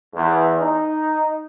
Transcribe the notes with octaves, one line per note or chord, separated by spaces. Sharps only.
E2
D#4